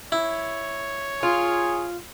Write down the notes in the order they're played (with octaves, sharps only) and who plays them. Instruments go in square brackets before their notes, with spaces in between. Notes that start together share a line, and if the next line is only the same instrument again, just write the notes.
[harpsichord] E4 [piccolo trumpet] C#5
[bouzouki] F4 [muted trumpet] G#4